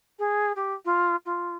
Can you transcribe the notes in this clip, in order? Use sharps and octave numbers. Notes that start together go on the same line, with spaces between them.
G#4
G4
F4
F4